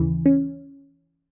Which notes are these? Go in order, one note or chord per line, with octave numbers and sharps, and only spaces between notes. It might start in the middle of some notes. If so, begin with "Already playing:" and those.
Already playing: D#2 C#3 E3
C#4